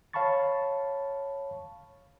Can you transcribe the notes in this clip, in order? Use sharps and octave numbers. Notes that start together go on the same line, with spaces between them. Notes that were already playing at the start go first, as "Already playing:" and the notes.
C#5 F5 A5 B5 C#6 A6